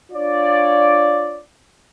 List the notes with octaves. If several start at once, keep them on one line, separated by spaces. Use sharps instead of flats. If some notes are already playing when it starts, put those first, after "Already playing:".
D4 F4 C#5 D5